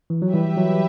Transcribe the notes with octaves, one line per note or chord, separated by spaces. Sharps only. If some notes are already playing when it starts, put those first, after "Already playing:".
E3
F#3
E3 G3 G4 B4 E5
F#3